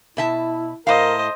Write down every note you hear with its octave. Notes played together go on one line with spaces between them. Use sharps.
B2 E4 E5 A5
A2 A#4 C5 D#5 F5